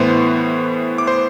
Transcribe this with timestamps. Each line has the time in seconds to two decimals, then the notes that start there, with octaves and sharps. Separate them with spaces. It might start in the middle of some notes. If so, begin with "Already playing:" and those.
Already playing: A2 E3 B3 C5 C6
0.98 D6
1.07 C5 C6